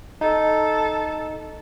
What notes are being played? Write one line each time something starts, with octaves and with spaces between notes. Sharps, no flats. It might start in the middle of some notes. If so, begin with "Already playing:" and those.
D#4 A4